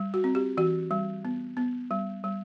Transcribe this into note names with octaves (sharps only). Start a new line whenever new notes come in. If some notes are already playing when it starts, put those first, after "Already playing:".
Already playing: G3
F#4
C4
G4
E3 F#4
G3
B3
B3
G3
G3